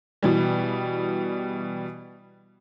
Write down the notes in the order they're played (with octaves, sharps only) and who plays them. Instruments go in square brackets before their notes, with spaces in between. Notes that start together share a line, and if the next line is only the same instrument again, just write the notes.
[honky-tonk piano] B2 E3 G3